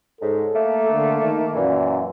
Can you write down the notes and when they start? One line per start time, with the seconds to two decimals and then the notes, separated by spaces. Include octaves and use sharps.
0.21 G#2 C#3 A4
0.54 A3 A#3
0.92 D3
1.22 D#3
1.55 F#2 A#2 E3